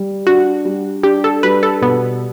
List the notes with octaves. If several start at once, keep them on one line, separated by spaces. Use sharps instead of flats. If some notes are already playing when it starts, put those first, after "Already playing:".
Already playing: G3
D4 F#4
G3
D4 G4
A4
G3 B4
A4
B2 B3